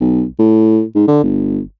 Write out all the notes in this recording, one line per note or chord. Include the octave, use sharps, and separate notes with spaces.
B1
A2
G#2
D3
G1